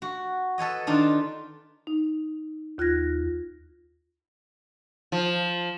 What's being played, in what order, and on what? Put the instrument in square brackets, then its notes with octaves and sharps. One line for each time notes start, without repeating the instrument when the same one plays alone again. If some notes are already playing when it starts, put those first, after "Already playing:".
[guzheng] F#4
A4 B4 C#5 D#5
D#3 D4 D#4 F4
[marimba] D#4
D#2 F4 F#6 G#6 A#6
[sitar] F3